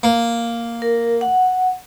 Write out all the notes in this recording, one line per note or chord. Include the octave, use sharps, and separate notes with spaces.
A#3
A#4
F#5